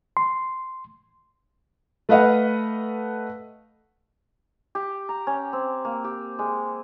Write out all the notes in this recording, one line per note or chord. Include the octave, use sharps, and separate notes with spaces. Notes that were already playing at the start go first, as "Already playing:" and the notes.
C6
A3 B4 D#5 F5 F#5
G4
A#5
C#4
C4
A#3
G4
G#3